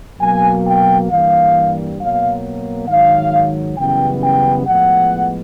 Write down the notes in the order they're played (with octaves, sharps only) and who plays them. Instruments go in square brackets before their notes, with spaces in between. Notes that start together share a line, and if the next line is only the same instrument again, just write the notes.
[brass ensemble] B2 F#3 A#3 G#5
G5
G2 E3 G3 A#3 F5
B2 F#3 A#3 F5
G#2 D#3 F#3 F5
F#2 C#3 E3 G3 B3 G5
G5
A2 F3 G#3 B3 F#5